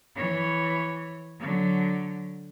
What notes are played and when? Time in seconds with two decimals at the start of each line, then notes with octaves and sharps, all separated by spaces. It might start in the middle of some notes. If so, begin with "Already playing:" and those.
0.15 E3 C#5
1.40 D3 F#3